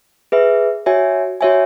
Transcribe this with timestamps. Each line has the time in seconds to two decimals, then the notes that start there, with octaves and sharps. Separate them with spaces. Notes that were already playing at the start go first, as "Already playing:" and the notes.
0.32 G#4 B4 E5
0.86 F#4 C#5 E5 G#5
1.41 F#4 C#5 E5 G#5